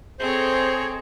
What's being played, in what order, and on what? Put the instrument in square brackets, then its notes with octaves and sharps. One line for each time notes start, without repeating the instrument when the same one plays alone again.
[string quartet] C4 [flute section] G#4 D#5 [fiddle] A4 C#5 [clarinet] C5